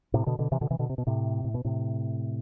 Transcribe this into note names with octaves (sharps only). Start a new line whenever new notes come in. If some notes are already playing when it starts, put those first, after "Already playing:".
A2 C3
B2 D3
B2 D3
C3 E3
B2 D3
C3 E3
B2 D3
C3
B2
A2 C3
A2
B2
A2 C3